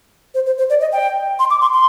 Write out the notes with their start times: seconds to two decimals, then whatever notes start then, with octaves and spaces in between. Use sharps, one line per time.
0.35 C5
0.46 C5
0.58 C5
0.70 D5
0.81 D#5
0.92 G5
1.39 C6
1.50 D6
1.61 C6
1.73 C6